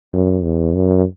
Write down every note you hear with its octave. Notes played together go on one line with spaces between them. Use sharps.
F#2
E2
F#2